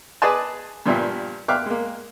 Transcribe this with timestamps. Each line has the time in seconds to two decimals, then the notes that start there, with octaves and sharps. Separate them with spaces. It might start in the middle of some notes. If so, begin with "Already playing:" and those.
0.22 G#4 B4 D5 D#5 G#5 A5
0.86 G2 A#2 F3 G3 E5
1.48 E5 F5 G5 D6 F6 F#6
1.66 G#3 A#3